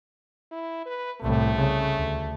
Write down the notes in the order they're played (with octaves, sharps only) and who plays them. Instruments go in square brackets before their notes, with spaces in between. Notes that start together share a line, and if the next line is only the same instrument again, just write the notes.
[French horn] E4
B4
[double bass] C2 A2 [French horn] A3
[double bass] C#3
D2